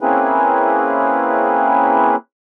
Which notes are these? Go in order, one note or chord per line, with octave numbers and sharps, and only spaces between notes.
A#3 C4 C#4 E4 G#4 B4